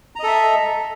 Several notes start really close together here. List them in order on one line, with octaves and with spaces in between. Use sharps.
A#5 D#5 A4 E5